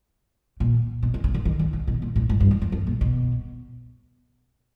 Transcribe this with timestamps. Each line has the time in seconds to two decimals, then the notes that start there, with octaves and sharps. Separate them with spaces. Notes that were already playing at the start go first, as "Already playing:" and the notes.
0.60 A#2
1.03 B2
1.14 C3
1.24 C#3
1.34 D3
1.45 D#3
1.59 D3
1.73 C#3
1.87 B2
2.02 A#2
2.16 A2
2.29 G#2
2.40 G2
2.51 F#2
2.62 E2
2.72 F2
2.87 A#2
3.01 B2